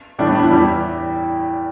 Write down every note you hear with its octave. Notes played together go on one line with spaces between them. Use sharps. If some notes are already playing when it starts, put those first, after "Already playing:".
A2 E3 G3 D4
B3
D4
E4
E2 E3 G3